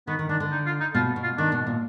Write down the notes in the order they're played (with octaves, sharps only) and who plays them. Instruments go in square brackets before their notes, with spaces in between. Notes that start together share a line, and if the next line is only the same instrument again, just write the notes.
[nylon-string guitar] D#3 [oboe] B3
[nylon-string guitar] D#3
[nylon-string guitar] D#3 [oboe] D4
[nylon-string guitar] D3
[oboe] D#4
F4
D#4
[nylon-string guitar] B2 [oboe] F4
[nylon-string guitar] B2
[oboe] F4
[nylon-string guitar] D#3 [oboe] D4
[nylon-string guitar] B2
A#2